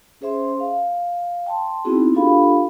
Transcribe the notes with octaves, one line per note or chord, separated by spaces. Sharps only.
C#4 G#4 C5 E5 C6
F5
G5 A5 C6
B3 C4 D#4 E4 F#4 G#4
D4 F4 G4 A4 F5 B5